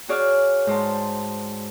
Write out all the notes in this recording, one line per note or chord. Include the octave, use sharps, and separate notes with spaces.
F#4 G#4 C#5 D5 F6
G#2 C5 A5